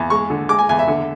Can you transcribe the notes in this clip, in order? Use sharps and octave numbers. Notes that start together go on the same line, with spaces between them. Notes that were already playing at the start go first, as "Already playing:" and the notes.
Already playing: E2
G#3 C#6
D3
G#3 D6
G#5
E2 G#5
E5
D3